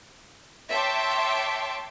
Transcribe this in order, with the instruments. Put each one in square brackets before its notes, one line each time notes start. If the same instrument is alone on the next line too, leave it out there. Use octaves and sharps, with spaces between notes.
[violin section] C#5 E5 G5 A5 C6 D6